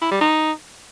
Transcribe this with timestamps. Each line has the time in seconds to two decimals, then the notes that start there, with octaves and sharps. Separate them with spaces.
0.02 E4
0.11 G3
0.21 D#4